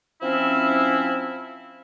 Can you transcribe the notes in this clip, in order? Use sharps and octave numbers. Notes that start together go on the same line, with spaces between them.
F3 C4 C#4 E4